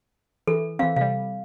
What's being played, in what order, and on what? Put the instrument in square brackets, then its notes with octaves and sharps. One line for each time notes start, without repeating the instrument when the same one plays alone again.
[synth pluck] E3 [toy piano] A4
[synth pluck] E3 C4 [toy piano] F5
[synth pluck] C3 G3 [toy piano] F5